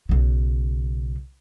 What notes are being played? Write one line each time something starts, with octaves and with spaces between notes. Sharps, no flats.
B1 C#3